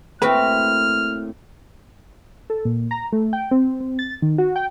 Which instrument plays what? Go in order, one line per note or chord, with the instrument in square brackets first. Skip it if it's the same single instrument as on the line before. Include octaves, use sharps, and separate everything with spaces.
[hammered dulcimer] A2 [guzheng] A#3 C4 F#4 [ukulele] B4 [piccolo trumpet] F6
[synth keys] A4
A#2
A#5
A3
G5
C4
C4
A6
D#3
F#4
G5